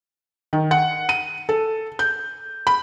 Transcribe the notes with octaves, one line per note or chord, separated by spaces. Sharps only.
D#3
F#5
D#7
A4
G6
B5